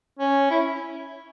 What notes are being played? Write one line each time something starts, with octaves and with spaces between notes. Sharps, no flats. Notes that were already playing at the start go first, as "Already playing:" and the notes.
C#4
E4